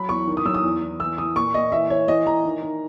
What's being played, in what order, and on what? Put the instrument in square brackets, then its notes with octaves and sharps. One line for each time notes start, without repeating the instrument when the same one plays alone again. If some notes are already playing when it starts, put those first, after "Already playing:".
Already playing: [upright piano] F#3 B5
E2 C#6
D#3
D#6
F#3 E6
D#6
E2
E2
E3 E6
E3 D#6
A#2 C#6
A#2 D#5
E3 E5
E3 C#5
E3 D#5
E3 A#5
D#3
D#3